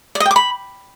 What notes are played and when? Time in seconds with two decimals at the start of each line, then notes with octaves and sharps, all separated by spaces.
0.15 D5
0.20 D#5
0.26 G5
0.31 D6
0.36 B5